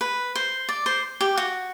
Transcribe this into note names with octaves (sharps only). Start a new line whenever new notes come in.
B4
C5
D5
C5
G4
F#4